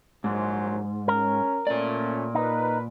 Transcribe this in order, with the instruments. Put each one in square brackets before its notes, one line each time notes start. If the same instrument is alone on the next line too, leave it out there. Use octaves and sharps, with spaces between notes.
[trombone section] A#1 F#3 C5 [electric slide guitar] G#2
[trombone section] C#4 [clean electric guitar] A#4
[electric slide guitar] A#2 D5 [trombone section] A3 C#4
[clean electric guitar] D#4 [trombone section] A#4 B4